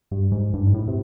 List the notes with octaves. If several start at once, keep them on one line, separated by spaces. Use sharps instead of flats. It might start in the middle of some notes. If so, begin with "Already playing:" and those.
G2
G#2
G2
G#2
A2
C3